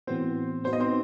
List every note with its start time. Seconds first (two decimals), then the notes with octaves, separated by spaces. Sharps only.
0.07 A2 E3 B3 C4 F#4 C5
0.64 B3 D#4 F#4 B4 C5
0.73 D#5
0.80 C4 C5